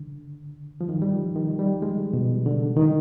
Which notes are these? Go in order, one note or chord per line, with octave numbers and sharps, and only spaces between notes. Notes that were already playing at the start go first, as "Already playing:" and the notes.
Already playing: D3
F3
D#3
G3
F3
D#3
G3
G#3
B2
D3
D#3